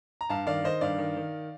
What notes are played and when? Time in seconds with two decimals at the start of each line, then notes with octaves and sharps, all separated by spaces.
0.21 A#5
0.30 G2 F5 A5
0.47 D#3 D5 F5
0.64 D#3 C5 D#5
0.81 G2 D5 F5
0.98 D#3
1.17 D#3